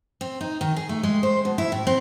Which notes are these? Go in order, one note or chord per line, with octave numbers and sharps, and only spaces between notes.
C4
D#4
D#3
G#4
A3
G#3
C5
B2
E4
A2
C4